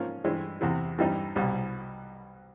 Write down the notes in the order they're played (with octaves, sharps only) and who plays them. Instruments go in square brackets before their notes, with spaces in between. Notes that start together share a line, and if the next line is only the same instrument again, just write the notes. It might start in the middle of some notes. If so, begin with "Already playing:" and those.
Already playing: [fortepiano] G#2 F3 A#3 C#4 F4
G2 E3 G#3 C4
E2 C3 E3
G2 E3 G3 C4 D#4
C2 B2 G3